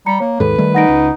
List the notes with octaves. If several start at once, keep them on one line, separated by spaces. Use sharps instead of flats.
G3 A#5 C#7
A#3 C#5
D#2 G#2 A4 B4
D#3 G3 A3
D#4 F#5 A#6 D7
C#2